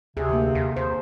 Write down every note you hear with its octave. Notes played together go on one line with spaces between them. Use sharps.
D2 C3 G#4
D3 A#3
D#2
D#2 C5